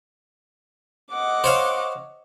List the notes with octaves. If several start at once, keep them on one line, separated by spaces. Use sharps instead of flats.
D#5 F#5 D6
C5 C#5 F5